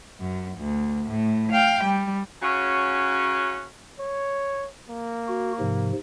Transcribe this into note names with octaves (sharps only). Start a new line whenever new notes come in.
F#2
D2
A2
F5 G5
G3
C#3 C#4 F#4
C#5
A#3
F#4
G#2 C3 F3